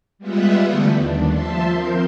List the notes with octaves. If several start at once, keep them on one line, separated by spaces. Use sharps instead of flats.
G3 G#3 B3 F4 E5 F#5
D3 E3 G3 A3 B3
D#2 D4
F3 E5 A5 C6
F3 C4 A#4 C6 G6